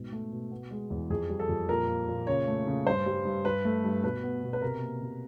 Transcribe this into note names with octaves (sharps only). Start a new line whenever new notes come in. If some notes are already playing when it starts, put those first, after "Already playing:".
Already playing: G#2 B2
A3
B2
B3
G#3
E2
F2 G#4
G3
A4
F2
A#2 A#4
A#3
A#2
C#3 C#5
A3
C#3
G2 C5
G3
G2
G2 B4
A3
G2
B2 B4
B3
B2
B4
C3 A#4
A#3
C3